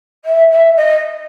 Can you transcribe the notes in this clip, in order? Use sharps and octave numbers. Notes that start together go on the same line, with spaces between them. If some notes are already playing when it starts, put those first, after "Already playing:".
E5
E5
D#5